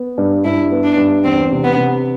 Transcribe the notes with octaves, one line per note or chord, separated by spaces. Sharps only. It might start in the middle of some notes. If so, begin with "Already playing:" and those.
Already playing: B3
G2
G2 E4
B3
D4
G2
E2 C4
C3
B3
C3